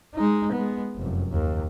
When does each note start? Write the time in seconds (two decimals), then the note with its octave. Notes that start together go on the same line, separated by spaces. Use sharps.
0.15 G#3 D#4
0.52 G#3 B3
0.97 F1 F#2
1.32 D#2